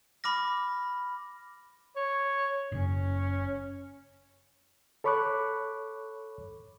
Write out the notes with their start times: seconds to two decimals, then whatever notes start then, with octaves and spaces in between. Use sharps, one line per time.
0.24 B5 D6 F6 A#6
1.96 C#5
2.72 F#1 C#4
5.04 A4 C#5 B5 C#6 D6 F#6